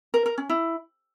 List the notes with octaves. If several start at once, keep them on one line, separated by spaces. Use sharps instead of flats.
A#4
A#4
C#4
E4